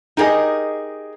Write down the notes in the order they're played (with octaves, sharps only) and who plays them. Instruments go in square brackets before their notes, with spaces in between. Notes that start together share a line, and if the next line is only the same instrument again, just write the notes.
[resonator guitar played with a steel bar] D#4 G4 G#4 A#4 D#5